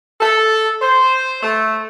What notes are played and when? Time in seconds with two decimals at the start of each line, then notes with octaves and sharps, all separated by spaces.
0.21 A4
0.82 C5
1.43 A3